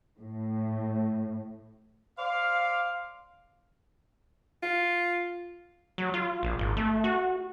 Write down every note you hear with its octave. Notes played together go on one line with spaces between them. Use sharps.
A2
C5 D5 F5
F4
F#3
F4
A#1
G#1
A3
F#4